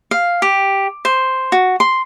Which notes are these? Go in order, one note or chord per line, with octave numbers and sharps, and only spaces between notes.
F5
G4
C5
F#4
C6